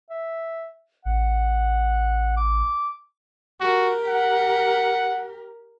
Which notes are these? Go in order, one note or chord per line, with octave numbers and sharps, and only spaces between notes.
E5
A1 F#5
D6
F#4 G4 A#4
F#5